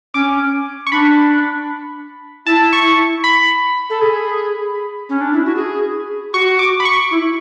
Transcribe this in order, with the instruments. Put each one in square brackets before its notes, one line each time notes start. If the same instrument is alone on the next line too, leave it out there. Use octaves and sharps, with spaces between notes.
[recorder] C#4 [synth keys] D6
[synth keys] C#6
[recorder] D4 [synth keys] B5
[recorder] E4 [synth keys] A5
[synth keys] C#6
B5
[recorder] A4
G#4
C#4
D4
E4
F#4
G#4
[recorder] F#4 [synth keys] C#6
[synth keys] D6
B5
C#6
[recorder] E4